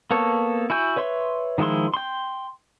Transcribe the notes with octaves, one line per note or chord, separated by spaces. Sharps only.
A#3 B3 A4 C#5
E4 F#4 G#5 G6
B4 C#5 E5 C6
D#3 F3 G#3 E4 C6
G5 C6